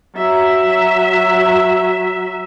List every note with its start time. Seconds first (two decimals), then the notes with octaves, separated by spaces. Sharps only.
0.16 F#3 E5